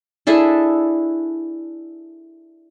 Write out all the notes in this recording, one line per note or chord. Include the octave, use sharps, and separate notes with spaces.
D4 E4 G#4 A4